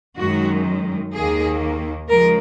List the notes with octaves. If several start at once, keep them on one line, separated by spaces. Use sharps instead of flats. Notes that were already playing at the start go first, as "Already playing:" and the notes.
F#2 D#3 G#3 F#4
D#2 D#3 A#3 G#4
C#3 F3 G#3 A#4